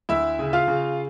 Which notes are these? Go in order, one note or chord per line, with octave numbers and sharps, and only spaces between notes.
D2 E4 E5
C#3
F4 F5
C#3